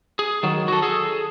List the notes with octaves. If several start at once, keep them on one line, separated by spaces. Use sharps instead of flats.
G#4
D#3 F#3
F#4 A4
G#4 A4